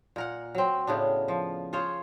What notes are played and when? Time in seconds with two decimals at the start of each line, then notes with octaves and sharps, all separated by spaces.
0.16 A#2 A#4 F#5
0.55 F#3 C4
0.87 A2 C#3 B3 D4
1.28 F3
1.73 F4 G#4 C5 C#5